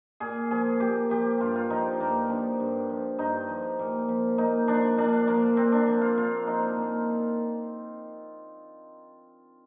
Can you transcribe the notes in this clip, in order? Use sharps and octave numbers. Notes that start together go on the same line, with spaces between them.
A#2 G#4
F3 G#4
A#2 G4
F3 G4
G2 F4
F4
F3 D#4
G2 A#3
F3 D4
G2
F3
G2 D#4
F3
A#2
F3
A#2 D#4
F3 D4
A#2 D4
F3 A#3
A#2 C4
D4
F3
F4
A#2 F4
F3 D#4
A#2